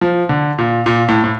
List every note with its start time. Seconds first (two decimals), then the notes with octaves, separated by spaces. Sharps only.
0.01 F3
0.29 D3
0.58 A#2
0.86 A#2
1.09 A2
1.24 A2